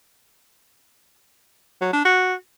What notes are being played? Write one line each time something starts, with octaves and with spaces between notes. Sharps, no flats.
F#3
D4
F#4